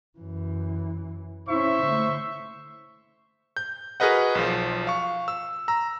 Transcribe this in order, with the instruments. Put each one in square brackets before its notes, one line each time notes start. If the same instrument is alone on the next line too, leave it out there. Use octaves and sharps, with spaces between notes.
[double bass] F#2 E3
[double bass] C#4 E4 [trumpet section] C5 E5 C#6
[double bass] D3 A3
[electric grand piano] G6
F#4 G#4 A#4 B4 D#5 F#5
B1 F3
F5 C#6
E6
A#5 E6